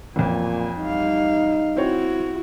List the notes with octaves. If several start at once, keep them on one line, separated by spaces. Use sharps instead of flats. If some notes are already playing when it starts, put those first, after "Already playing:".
A1 F2 A#2 G#5
G3 D#4 F5
C4 E4 F#4 C#5